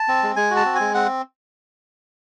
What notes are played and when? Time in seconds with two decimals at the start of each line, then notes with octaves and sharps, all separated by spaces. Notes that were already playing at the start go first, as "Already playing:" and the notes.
Already playing: A5
0.08 C4
0.23 G#3
0.36 G#3 G#5
0.51 F#4
0.56 A5
0.65 C4
0.75 G#5
0.80 G#3
0.94 C4 F#5